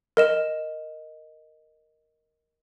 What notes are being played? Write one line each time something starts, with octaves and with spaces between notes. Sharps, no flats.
A#4 D#5 E7